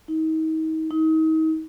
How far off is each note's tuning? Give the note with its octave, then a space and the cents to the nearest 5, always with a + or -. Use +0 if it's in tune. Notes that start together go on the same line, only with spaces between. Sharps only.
D#4 +35
D#4 +35